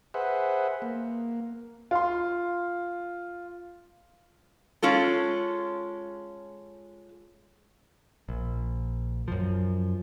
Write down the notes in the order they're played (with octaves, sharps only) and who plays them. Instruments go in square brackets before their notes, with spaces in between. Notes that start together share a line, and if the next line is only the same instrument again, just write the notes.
[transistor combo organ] G#4 B4 C5 E5 F#5
A#3
[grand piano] F4 C6
[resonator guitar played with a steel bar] G#3 C#4 F4 A4
[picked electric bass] A#1
F#2 F3